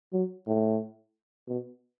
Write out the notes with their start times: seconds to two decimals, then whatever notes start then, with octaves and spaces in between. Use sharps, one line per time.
0.13 F#3
0.47 A2
1.48 B2